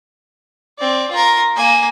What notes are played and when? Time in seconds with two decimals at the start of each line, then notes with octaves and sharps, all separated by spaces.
0.79 C4 D5
1.11 F4 A#4
1.56 A#3 G#5